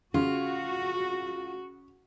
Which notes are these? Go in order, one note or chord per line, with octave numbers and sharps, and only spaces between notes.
C#3 F4 F#4